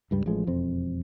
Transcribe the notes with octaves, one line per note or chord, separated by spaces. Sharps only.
C#2 G2 G3
A1 F3 G#3
E1 F2 C4